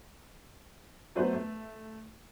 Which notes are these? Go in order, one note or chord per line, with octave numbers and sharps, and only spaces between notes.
F#3 A3 B3 B4 C5
A3